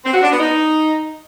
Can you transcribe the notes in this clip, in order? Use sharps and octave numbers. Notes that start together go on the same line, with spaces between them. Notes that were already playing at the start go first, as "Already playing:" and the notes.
C4
F#4
D4
B3
D#4